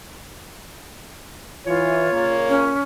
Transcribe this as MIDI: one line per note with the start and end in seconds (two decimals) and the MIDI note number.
1.66 2.10 52
1.66 2.34 65
1.66 2.69 73
2.12 2.73 46
2.12 2.73 49
2.12 2.73 58
2.49 2.83 61